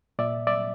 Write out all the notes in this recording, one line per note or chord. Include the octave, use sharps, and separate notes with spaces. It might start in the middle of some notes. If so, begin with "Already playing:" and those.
A#2 D5 E5
D5 E5